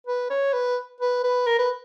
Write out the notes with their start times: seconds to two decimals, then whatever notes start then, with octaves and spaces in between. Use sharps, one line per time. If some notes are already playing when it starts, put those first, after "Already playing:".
0.07 B4
0.30 C#5
0.53 B4
1.00 B4
1.24 B4
1.46 A#4
1.59 B4